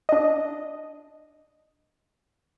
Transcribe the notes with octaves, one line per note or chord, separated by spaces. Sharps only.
D4 D#5